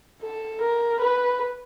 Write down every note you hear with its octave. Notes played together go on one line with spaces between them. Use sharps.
A4
A#4
B4